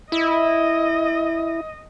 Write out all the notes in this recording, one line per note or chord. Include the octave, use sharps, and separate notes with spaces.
E4 D#5